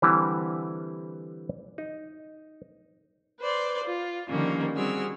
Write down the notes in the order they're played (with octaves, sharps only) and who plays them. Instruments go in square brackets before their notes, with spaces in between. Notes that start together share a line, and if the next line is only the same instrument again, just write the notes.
[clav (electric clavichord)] D3 E3 G3 C4 E4 G4
D#4
[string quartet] B4 C5 D5
F4
D3 D#3 F3 G3 A#3 C#4
G3 C4 F#4 G#4 E6 F6